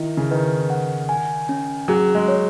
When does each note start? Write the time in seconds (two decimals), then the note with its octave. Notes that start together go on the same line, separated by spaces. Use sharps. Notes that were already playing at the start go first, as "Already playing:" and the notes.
Already playing: D#3 E4
0.17 C#3
0.30 D#3 B4
0.70 F#5
1.09 G#5
1.49 C#4
1.88 F#3 G#4
2.15 G#3
2.28 C#5